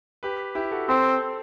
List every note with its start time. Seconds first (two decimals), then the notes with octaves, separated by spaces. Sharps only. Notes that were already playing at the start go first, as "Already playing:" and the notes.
0.23 G4 B4
0.55 E4 G4
0.71 F#4 A4
0.89 C4 A4 C5